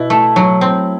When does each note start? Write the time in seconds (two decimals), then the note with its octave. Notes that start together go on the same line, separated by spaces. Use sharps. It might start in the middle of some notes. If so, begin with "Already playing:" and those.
Already playing: B2 E4
0.10 A3
0.36 F#3
0.61 C4